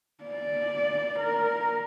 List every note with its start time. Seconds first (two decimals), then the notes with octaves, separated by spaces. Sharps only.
0.24 D5
1.19 A#4